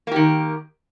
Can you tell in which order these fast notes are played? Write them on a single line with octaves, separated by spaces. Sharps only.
A#3 G4 D#3